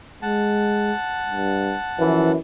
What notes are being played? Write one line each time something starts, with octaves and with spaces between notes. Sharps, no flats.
G#3 F#5 A5
G2
F#2 E3 F3